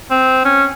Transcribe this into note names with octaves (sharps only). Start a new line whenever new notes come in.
C4
C#4